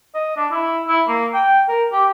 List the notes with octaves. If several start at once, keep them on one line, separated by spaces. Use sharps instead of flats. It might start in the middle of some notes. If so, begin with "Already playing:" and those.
D#5
D4
E4
E4
A#3
G5
A#4
G4